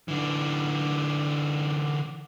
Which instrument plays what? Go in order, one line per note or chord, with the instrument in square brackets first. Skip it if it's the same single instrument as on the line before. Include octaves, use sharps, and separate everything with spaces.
[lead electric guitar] D3 E3